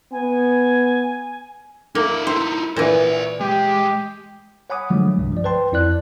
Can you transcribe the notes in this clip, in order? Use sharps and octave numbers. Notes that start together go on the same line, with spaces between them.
B3 G#5
A#3 D#4 E5
D#4 E4 C5
A#2 E3 C5 D5
G#3 G4
C#5 F#5 G#5 B5 D6 D#6
D3 F3 F#3 G#3 A3
C2 G2 C3
F3 D5
B4 C5 G5 A5 C6
F2 E4 D5 F#6